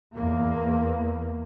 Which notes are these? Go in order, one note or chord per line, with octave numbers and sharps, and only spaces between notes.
E2 A#3